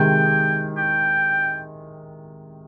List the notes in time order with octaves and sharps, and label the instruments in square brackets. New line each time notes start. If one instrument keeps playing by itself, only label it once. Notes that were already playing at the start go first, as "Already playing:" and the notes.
Already playing: [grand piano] C3 D#3 G#3 [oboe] G5
[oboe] G5